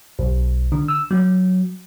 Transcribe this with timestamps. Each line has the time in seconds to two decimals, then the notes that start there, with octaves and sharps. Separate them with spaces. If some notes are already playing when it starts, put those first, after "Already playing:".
0.19 B1
0.72 D3
0.88 E6
1.11 F#3